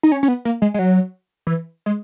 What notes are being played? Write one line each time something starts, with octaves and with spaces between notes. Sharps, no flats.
D#4
C#4
C#4
B3
A#3
G#3
G#3
F#3
E3
G#3